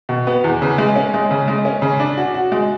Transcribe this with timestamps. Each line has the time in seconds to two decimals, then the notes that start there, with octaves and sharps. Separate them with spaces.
0.09 B2
0.27 B3
0.44 E2
0.62 C#3
0.78 G#3
0.96 C#4
1.14 G#3
1.31 C#3
1.48 G#3
1.65 C#4
1.82 C#3
2.00 D4
2.17 F#4
2.34 F#4
2.52 G#3